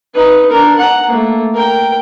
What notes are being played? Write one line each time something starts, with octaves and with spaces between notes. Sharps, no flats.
D#4 B4
D4 A#4
F#5 A#5
A3 A#3
A#4 G5